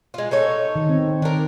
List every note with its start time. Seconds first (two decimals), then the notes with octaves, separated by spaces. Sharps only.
0.14 G#3 F4
0.31 D#4 A4 C#5
0.76 D#3
0.89 C4
1.22 D#3 D4 A#4